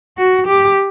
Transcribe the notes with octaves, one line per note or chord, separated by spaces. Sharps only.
F#4
G4